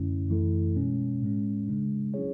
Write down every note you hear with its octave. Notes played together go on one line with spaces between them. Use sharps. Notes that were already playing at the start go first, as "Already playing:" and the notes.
Already playing: F#2 D3 A3 C#4 E4
F#2 E3 A3 E4 A4
B2 G#3 C#4
A2 G#3 C#4
C#3 G#3 D4
F#3 C#4 E4 G#4 C#5